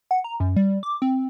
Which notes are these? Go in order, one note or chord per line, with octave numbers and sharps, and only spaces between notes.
F#5
A#5
F#2
G3
D6
C4